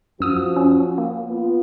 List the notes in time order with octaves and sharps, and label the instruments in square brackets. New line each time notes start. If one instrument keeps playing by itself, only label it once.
[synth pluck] F#2 D#6 E6 [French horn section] F3 F#4
[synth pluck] C#4
A#3
[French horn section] B3 F4